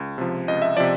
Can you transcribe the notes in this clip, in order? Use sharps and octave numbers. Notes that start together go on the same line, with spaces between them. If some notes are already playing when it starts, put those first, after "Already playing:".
Already playing: C#2
C3 F3
C#2 D#5
E5
C3 F3 D5